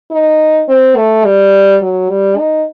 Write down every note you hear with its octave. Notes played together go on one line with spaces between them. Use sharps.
D#4
C4
A3
G3
F#3
G3
D#4